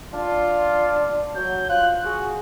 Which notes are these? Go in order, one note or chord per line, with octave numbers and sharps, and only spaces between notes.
D4 F4
F#3 G6
F4 F#6
F#4 G#4